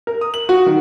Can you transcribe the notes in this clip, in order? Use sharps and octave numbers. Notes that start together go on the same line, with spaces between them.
A#4
D#6
F#7
F#4
D#3